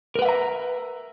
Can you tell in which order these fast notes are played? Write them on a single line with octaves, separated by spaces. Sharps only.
A#4 B4 F#5 E5 A#5